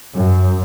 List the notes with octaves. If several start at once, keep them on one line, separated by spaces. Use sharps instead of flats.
F#2